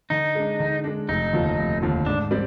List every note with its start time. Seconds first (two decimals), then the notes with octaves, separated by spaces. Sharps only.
0.10 D3 D#4
0.35 G#3 D4
0.60 D3
0.84 G#3 D4
1.08 F1 D#4
1.33 D#2 D3 F3
1.58 F1
1.82 D#2 D3 F3
2.06 G#2 D4
2.31 G3 C4 D5